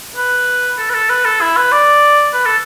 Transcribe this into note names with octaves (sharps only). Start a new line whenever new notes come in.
B4
A4
B4
A4
B4
A4
E4
B4
D5
B4
A4